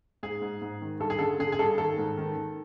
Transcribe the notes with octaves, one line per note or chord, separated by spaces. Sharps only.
G#2 G#4
G#2
G#2
D#3
G2 A4
G#4
D3 A4
D3 G#4
G#4
G2 A4
D#3 A4
G#2
D#3
D#3